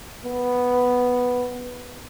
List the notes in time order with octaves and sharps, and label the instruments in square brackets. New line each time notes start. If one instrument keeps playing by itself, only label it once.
[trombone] B3